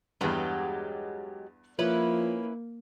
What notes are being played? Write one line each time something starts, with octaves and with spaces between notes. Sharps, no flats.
E2 G2 F#3 G#3 G4
F3 A#3 C#4 E4 B4